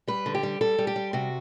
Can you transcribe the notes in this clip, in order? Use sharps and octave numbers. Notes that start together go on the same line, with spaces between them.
G3 B4
D3
G4
G3
G3 A4
G3
G4
G3
C3 F#4